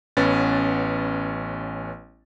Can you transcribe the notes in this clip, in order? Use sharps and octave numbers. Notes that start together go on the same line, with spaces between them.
A1 B3 C#4 B4 A6